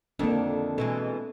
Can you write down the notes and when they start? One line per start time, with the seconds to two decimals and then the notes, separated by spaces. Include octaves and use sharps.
0.19 F2 D3 D#3 A#3 C4 D4
0.78 B2 E3 G#3 A4